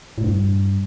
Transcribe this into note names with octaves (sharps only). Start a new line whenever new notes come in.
A2
G2